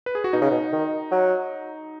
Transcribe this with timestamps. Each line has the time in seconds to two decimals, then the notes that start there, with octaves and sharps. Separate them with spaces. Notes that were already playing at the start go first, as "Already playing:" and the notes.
0.06 B4
0.15 G#4
0.24 F#4
0.33 B2 D#4
0.41 C#3
0.51 B2
0.72 D#3
1.11 F#3